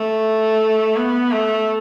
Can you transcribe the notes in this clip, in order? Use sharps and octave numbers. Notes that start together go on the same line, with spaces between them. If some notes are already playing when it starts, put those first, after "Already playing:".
Already playing: A3
B3
A3